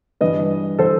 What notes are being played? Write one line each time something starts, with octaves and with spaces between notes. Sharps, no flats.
G2 E3 B4 D#5
E3 A4 C5